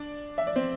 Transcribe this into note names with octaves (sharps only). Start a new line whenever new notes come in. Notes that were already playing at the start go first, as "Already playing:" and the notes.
Already playing: D4 D5
E5
D5
C4 C5